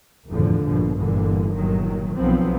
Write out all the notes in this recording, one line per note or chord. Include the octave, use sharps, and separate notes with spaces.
F#1 E2 A2 D3 F3
A#1 G2 B2 F3
G1 A#2 D3 E3
G1 A#2 D#3 F#3
B1 F3 F#3 B3 C4